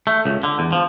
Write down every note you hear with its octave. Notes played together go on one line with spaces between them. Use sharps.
A3
C#2
D3
E2
F3